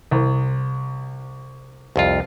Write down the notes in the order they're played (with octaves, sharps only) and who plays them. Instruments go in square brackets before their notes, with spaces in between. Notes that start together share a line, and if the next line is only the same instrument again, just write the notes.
[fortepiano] C2
[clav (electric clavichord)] C2 F2 F4